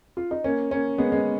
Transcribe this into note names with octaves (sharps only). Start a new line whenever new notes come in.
F4
D#4
A#3 C#4
A#3 C#4
G#3 B3
G#3 B3